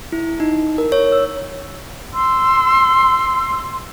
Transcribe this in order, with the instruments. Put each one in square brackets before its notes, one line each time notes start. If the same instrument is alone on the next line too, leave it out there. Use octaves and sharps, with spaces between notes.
[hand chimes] E4
D#4
A#4
C#5
E6
[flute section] C6 E6